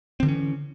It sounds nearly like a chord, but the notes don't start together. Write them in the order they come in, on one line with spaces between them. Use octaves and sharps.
C4 D3 E3 C#4